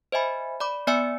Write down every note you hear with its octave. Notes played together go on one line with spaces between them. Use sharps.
C5 D#5 E5 G#5 B5
D5 B5 D6
B3 D5 E5 G#5 E6 C#7